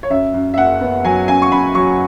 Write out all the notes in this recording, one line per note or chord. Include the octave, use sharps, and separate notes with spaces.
C#5
F#2 E5
F#2
E5
F#1 F#5
B3
F#3 G#5
F#2 G#5
C#6
F#2 B5
F#3 C#6